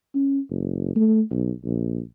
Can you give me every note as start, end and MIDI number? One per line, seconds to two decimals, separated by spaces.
0.14 0.39 61
0.50 0.91 30
0.96 1.21 57
1.30 1.51 35
1.64 2.00 34